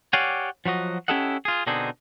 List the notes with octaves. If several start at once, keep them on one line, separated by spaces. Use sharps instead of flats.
G4 C#5 D5 F5 F#5 G#5
F3 F#3 F#4 D#5
C#4 E4 G4 A4 D#5 F#5
F4 G#4
B2 D3 C4 D4 D#4 G#4